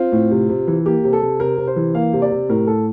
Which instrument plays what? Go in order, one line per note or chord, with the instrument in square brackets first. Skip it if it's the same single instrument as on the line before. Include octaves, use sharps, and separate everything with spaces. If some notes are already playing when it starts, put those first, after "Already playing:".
Already playing: [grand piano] C4 F4
A2
C3
C3
E3
A#3 G4
C3
A4
C3
C3 A#4
C3
C5
E3
A#3 F5
C3
D5
C3
A2 A#4
A2 A4